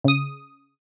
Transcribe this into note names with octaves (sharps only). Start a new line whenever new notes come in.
C#3 D#6